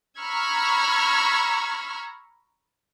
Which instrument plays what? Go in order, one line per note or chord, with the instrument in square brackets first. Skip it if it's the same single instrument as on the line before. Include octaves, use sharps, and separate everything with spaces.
[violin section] A#5 B5 C#6 E6 F6 G#6